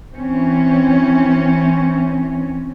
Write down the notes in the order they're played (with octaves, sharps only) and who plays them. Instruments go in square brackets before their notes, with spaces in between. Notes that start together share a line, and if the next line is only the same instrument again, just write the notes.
[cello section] E3 C4 C#4